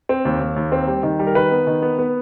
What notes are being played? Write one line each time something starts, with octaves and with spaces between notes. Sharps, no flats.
C4
D#2
D#2
D#2
C4
G3
D#3
G3
A#4
D#3 B4
B3
D#3
B3
B3